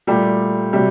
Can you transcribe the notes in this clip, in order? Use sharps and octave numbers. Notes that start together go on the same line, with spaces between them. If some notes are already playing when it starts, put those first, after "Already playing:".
A#2 G3 A3 G4
C3 F#3 G3 G4